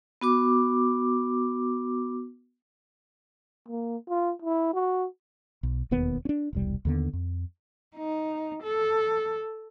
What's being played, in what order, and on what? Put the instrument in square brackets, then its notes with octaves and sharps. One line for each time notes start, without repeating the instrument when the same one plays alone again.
[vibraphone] B3 F#4 D6
[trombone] A#3
F4
E4
F#4
[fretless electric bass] B1
E1 D#2 B3
C#4 D4
E1 C2 G3
D#2 D3 B3
F2
[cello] D#4
A4